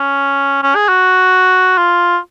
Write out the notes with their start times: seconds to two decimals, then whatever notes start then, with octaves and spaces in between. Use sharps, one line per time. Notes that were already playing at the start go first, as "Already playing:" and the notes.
Already playing: C#4
0.63 C#4
0.75 G#4
0.89 F#4
1.78 F4